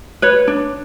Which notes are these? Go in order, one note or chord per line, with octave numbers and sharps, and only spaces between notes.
B4 C#5
D4